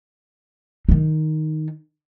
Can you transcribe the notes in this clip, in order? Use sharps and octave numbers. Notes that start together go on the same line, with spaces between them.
D#3 D#4